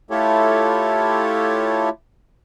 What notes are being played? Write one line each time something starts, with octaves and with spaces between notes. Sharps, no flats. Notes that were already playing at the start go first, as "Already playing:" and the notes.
A3 E4 F4 G4 A4 C#5